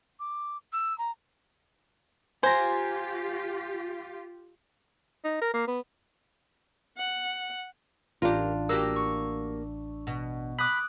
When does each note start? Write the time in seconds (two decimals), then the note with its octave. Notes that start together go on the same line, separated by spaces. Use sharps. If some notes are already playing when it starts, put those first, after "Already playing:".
0.19 D6
0.72 E6
0.98 A#5
2.43 F4 G4 C5 G#5 A#5
5.24 D#4
5.41 A#4
5.54 A#3
5.68 B3
6.97 F#5
8.22 A1 D4 F4 G4 A#4
8.69 A#3 F#4 G4 E6
8.96 C#6
10.07 B2
10.59 B5 D6 D#6 F#6